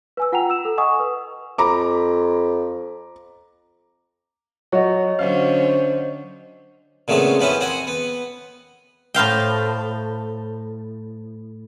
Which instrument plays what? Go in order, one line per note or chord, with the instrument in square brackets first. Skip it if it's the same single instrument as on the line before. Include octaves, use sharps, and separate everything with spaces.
[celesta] B4 G#5 E6
F4 F#5 G5 A#5 F7
E6 E7
A4
D#5 F#5 G#5 C#6 D#6
B4
[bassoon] F2 [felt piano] A#5 B5 D6
[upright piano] F#3 F#4 [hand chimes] C#5 D#5
[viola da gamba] D3 F#3 C#4 [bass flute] C5 [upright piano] F5
[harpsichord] A#2 C#3 A3 B3 C4
F3 B3 C#4 E4
C4 F#5 G#5
B3
[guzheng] A2 C5 F5 G5